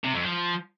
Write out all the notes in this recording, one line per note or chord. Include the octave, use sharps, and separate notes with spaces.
C3
F2
F3